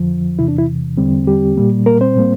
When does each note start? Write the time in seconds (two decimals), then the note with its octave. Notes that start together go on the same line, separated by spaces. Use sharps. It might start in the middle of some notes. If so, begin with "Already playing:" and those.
Already playing: F2 D3 F3
0.39 E2 C3 E3 E4
0.48 D4
0.58 E4
0.98 E2 D3 G3 C4
1.27 G3 G4
1.57 A#2 G3 A#3
1.86 A#3 A#4
2.01 C4 C5
2.16 A2 G3 A#3